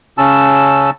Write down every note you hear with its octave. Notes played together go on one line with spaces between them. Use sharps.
C#3 C#4 A5 E6